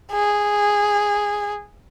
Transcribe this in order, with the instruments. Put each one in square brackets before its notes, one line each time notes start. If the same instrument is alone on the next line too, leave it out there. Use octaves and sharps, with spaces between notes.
[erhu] G#4